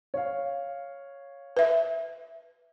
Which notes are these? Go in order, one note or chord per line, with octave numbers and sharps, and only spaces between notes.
C#5 F5
B4 E5